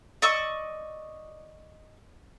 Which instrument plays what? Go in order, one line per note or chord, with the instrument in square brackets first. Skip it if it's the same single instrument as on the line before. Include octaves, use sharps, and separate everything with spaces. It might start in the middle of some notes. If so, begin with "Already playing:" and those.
[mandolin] D5 D#5 C#6 E6